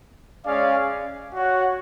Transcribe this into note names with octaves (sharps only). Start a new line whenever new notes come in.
G#3 C#4 G#4 D5 F5
F#4 C#5 F#5